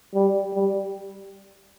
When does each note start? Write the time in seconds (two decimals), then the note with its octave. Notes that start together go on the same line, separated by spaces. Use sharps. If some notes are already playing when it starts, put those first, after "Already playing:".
0.14 G3
0.54 G3